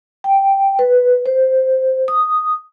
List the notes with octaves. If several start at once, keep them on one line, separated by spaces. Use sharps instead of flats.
G5
B4
C5
D#6